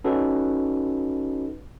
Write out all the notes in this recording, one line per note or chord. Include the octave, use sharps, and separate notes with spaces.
C#4 D#4 F#4 A4 B4